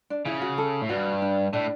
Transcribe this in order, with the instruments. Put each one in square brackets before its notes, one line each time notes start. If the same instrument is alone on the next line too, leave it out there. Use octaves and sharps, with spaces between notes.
[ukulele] D4
[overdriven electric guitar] C#3 [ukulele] E4
[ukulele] F#4
A4
[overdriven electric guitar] A2
[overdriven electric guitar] G2 [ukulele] F#4
[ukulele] D4
[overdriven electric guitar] A2 [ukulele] D4